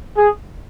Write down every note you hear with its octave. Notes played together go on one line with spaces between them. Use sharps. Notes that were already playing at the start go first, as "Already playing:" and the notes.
G#4